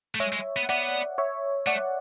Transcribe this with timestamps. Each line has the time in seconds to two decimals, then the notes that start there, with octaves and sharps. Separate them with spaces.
0.15 A3
0.20 G#3 C#5 E5
0.33 G#3
0.56 B3
0.69 B3 D5 F#5
1.18 C#5 E5
1.67 A3 D5 F#5